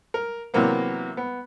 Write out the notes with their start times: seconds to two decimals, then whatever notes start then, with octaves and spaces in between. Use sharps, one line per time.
0.14 A#4
0.54 C3 E3 F#3 A#3 B3
1.17 B3